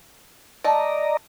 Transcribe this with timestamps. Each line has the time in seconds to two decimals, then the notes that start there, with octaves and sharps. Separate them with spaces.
0.64 A3 D5 D#5 A5 A#5